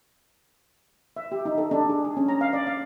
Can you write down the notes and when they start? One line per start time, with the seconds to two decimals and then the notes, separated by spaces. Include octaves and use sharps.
1.16 E5
1.32 G4
1.45 D#4
1.58 A4
1.71 D4
1.90 G#4
2.05 G#4
2.17 C#4
2.28 A#5
2.41 F5
2.53 D5
2.67 F5